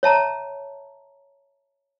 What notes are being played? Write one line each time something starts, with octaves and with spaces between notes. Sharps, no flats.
C#5 E5 A5 A#5